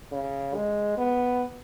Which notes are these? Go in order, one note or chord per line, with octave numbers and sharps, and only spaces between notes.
C#3
G#3
B3